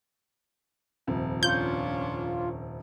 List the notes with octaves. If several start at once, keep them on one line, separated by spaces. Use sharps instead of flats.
D#1 F2 C3
C#4 D4 F4 G6